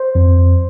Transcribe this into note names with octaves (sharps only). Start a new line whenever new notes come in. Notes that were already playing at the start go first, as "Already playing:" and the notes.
Already playing: C5
F2